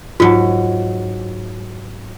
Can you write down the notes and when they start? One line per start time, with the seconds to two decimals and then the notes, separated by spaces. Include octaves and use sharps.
0.20 G#2 F#3 F4